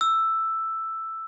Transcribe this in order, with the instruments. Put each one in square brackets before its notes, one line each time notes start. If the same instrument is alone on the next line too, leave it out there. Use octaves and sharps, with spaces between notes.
[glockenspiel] E6